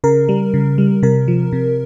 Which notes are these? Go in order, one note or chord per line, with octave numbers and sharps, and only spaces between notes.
C#3 A#4
G3
C#3
G3
C3 A#4
F3
C3